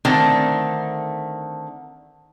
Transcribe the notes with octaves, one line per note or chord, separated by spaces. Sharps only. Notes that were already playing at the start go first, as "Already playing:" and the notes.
D3 D#3 A3 C4